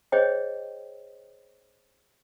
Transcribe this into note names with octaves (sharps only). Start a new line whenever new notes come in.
G#4 C5 C#5 D#5 G5